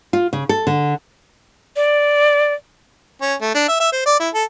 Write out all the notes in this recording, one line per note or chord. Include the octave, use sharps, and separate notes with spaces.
F4
C#3
A4
D3
D5
C#4
A3
D4
E5
E5
C5
D5
E4
A4